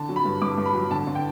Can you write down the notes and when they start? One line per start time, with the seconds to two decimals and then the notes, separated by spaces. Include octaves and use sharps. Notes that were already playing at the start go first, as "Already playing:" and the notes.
Already playing: D3 A5
0.09 F#3
0.16 B5
0.25 G2
0.41 G2 D6
0.58 G2
0.66 B5
0.75 F#3
0.91 D3 A5
1.07 D3
1.15 G5